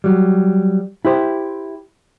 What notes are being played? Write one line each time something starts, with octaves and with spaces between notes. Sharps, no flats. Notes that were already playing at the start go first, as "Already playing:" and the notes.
F#3 G3
E4 G4 C5